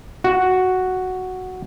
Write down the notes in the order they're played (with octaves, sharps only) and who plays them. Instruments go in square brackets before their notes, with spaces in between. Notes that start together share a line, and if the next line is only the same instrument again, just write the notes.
[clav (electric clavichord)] F#4